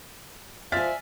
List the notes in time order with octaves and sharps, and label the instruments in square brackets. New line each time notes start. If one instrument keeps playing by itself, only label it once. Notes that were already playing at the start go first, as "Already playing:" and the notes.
[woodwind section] F3 [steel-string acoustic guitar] D5 G#5 [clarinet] E5 [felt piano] F6 A6 B6